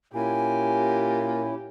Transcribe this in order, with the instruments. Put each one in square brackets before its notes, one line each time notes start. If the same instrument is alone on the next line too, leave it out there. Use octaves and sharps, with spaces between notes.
[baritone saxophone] A#2 [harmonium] C#4 E4 [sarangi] G4 [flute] G#5